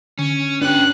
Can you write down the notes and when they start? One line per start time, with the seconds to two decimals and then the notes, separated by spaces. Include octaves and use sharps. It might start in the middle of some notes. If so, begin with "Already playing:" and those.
0.19 D3 C#4
0.62 B3 C#4 D4 G4 F#6